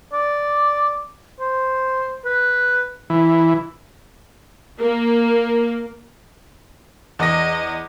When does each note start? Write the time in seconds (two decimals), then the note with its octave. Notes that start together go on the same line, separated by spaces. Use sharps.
0.13 D5
1.40 C5
2.25 B4
3.10 E3
4.80 A#3
7.19 E2 D#5 A#6